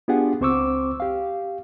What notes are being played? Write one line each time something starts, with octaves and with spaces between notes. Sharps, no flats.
B3 D4 F4 G4 G#4 F#5
C#2 C4 C5 C#6 D6 E6
G4 F5